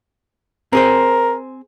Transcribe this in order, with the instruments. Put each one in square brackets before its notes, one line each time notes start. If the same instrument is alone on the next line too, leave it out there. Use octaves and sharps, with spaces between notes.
[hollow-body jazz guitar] C4 G#4 C5 [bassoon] A#4